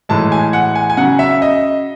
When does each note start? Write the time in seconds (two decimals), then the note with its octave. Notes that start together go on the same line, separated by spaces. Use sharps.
0.09 A2 E3 G#3 A5
0.32 G#5
0.53 F#5
0.75 G#5
0.90 G#5
0.97 C#3 F#3 F#5
1.19 E5
1.42 D#5